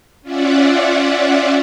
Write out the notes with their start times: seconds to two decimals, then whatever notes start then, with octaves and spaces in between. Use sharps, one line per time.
0.22 C#4 F4 D5 E5 F#5